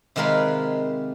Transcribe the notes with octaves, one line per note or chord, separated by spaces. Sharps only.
C3 D#3 G#3 F4 A#4 B4